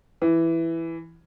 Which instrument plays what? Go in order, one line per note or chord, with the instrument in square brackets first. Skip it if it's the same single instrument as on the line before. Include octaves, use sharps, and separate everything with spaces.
[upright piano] E3